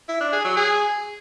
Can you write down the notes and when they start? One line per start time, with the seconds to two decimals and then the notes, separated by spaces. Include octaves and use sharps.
0.08 E4
0.20 D4
0.32 G#4
0.44 F#3
0.56 G#4